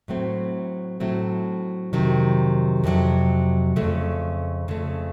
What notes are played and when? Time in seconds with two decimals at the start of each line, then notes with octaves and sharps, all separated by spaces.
0.08 A2 F#3 A3 C4
1.00 A2 F#3 A3 C4
1.93 F2 C3 D#3 F#3
2.84 F2 C3 D#3 F#3
3.76 F2 C#3 A3
4.68 F2 C#3 A3